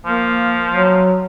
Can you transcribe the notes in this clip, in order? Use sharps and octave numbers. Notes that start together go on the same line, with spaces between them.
F3 A#3
F#3